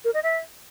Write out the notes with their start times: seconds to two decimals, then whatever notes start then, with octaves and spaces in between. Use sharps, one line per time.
0.05 A#4
0.14 D#5
0.23 E5